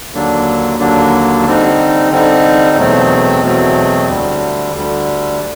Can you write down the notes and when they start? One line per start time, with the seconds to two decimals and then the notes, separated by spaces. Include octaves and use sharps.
0.14 D#2 D3 F#3 A#3 D4
0.79 D#2 D3 F#3 A#3 D4
1.45 D3 G3 C4 D#4
2.11 D3 G3 C4 D#4
2.77 E2 B2 F#3 A3 C4
3.43 E2 B2 F#3 A3 C4
4.09 D2 D3 G3
4.74 D2 D3 G3